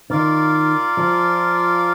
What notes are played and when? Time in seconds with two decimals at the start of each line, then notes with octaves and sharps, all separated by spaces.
0.10 D#3 F4 A#4 D5
0.97 F3